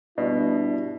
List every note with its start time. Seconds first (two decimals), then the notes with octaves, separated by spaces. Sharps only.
0.18 G2 B2 D4 E4